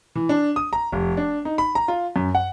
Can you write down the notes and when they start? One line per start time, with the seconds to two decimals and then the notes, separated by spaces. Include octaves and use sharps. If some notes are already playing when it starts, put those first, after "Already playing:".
0.15 E3
0.29 D4
0.56 D#6
0.73 A#5
0.92 F1
1.17 D4
1.45 D#4
1.58 B5
1.75 A#5
1.88 F4
2.16 F#2
2.35 F#5